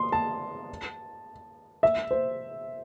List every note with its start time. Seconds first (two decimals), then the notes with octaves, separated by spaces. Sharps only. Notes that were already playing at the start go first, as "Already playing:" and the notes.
Already playing: C6
0.12 A5
1.83 E5
2.11 C5